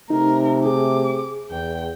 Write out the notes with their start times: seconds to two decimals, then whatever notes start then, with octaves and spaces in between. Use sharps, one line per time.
0.10 C3 A3 D#4 A#4
0.65 G#4 D6
1.51 E2 G5